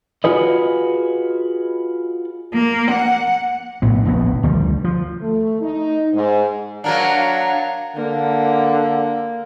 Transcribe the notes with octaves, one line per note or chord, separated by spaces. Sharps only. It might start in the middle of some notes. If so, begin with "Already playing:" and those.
F4 F#4 G#4 B4 D#5
A#3
F#5
A#1 A2 B3
F1 A#1 D#2 B3
D2 D#3 F3 G3
F3
A3
D#4
G#2
F#3 A#3 D4 F5 F#5 A#5
D3 A#3